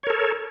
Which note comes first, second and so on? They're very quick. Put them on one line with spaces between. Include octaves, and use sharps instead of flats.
C#5 A#4 A4